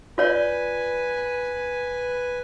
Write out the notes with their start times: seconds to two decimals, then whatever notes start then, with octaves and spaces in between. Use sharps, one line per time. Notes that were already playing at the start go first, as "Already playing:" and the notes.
0.18 F4 B4 C#5 D5 G#5